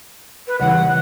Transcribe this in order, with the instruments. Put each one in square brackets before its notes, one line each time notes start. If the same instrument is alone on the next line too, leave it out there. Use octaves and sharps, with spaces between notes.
[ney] B4
[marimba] C#3 [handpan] E3 G3 D#5 [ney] F#5